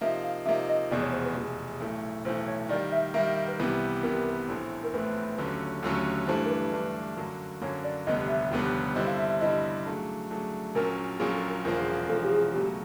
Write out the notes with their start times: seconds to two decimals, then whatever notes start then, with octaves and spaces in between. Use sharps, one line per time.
0.01 C3 F3 A#3 D#4 E5
0.23 F5
0.45 C3 F3 A#3 D#4 E5
0.68 D#5
0.91 F1 E2 B2 G#3 D5
1.02 C#5
1.12 C5
1.25 B4
1.35 F1 E2 B2 G#3
1.80 B1 A2 E3 A3
2.25 B1 A2 E3 A3 C5
2.47 C#5
2.69 D#3 G3 A#3 D5
2.92 E5
3.14 D#3 G3 A#3 E5
3.25 E5
3.36 E5
3.48 B4
3.59 C2 C3 E3 G3 B3 B4
4.03 C2 C3 E3 G3 B3 A#4
4.48 A#1 A2 E3 A3 C4
4.84 A#4
4.93 A#1 A2 E3 A3 C4 B4
5.38 D#2 D3 F#3 A3 C#4
5.83 D#2 D3 F#3 A3 C#4
6.27 G2 E3 A3 D4 C5
6.45 A#4
6.50 B4
6.72 G2 E3 A3 D4
7.17 F#2 D3 F#3 A#3
7.61 F#2 D3 F#3 A#3 C#5
7.84 D5
8.07 F1 D#2 D3 G3 B3 D#5
8.29 E5
8.51 F1 D#2 D3 G3 B3
8.95 G2 D3 G3 C4 E4 D#5
9.07 F5
9.19 E5
9.29 E5
9.41 G2 D3 G3 C4 E4 D#5
9.85 C#3 F#3 A3 D4
10.30 C#3 F#3 A3 D4
10.75 A#1 A#2 F#3 A#3 C#4 A#4
11.19 A#1 A#2 F#3 A#3 C#4 G#4
11.34 A4
11.49 A#4
11.64 E1 E2 C#3 F3 A#3 A#4
12.09 E1 E2 C#3 F3 A#3 A4
12.24 G4
12.32 G#4
12.53 C#2 B2 F#3 A3 G4